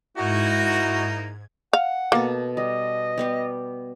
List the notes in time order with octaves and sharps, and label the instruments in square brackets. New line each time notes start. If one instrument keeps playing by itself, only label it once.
[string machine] G#2 G#6 [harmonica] A#3 D#4 [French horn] E4 [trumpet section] F#4
[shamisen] F5 [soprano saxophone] F#5
[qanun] B2 A4 [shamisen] A#3
[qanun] G3 [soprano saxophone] D#5
[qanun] G3 B3 G4